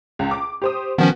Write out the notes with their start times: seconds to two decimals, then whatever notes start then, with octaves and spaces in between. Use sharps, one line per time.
0.19 C#2
0.31 D6
0.62 G4 C5 D#6
0.98 D#3 F3 B3 C#4 F#4